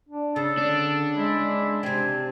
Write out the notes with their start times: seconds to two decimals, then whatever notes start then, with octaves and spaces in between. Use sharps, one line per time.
0.09 D4
0.36 C#3 A4
0.58 D3 D4
1.16 G#3 E4
1.83 C3 C4 G#5